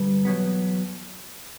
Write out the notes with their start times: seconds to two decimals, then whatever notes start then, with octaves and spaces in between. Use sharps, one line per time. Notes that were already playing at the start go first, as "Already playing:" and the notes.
Already playing: G2 D3 G3 B4
0.25 E2 B2 F#3 B3